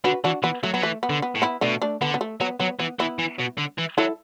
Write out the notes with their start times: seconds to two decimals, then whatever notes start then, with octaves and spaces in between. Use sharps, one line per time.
0.04 D3 F#4 B4
0.24 E3 D4 F#4
0.43 E3 B3
0.63 F#3 A3
0.74 F#3 B3
0.83 E3 A3
1.03 B3
1.10 D3
1.22 B3
1.35 A2
1.42 B3 E4
1.61 B2 A3 D4
1.82 A3 D4
2.01 D3 B3
2.14 B3
2.21 A3
2.41 F#3 B3
2.60 F#3 B3
2.79 E3 B3
2.99 E3 B3 E4
3.19 E3
3.39 B2
3.58 D3
3.78 E3
3.98 F#3 E4 A4